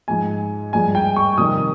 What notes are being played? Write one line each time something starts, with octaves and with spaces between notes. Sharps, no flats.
G#2 F3 G#3 G#5
G2 F3 G#3 G#5
G5
C#6
F2 C3 D#3 G3 D#6